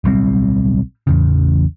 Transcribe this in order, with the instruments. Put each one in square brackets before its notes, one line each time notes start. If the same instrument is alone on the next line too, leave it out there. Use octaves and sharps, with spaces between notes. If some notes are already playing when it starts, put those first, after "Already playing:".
[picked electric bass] D1 B1 G3 C4
A1 E2 C#3